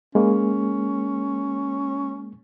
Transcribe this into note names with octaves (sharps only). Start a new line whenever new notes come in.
G#3 A#3 C#4